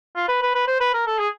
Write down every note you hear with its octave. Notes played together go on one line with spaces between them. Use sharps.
F4
B4
B4
B4
C5
B4
A#4
A4
G#4